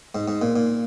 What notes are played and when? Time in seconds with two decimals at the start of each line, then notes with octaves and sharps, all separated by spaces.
0.15 G#2
0.28 G#2
0.42 A#2
0.56 A#2